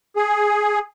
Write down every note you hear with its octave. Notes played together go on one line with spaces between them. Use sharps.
G#4